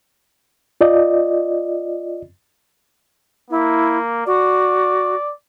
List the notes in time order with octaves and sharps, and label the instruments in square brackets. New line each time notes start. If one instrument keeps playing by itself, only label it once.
[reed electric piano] F4 D5 D#5
[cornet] A#3 [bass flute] E4
[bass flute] F#4 [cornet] D5